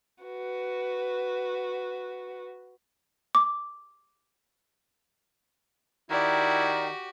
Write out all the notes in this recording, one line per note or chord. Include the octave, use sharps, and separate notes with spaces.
F#4 B4
D6
D#3 E4 F#4 G4 D5